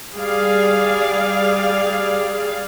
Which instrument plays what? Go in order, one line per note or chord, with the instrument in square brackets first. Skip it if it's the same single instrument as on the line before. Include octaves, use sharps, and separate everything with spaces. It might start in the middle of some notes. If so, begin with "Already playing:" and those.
[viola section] G3 G#4 D5 F5